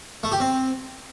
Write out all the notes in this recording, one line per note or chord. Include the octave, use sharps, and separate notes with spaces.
A3
G4
C4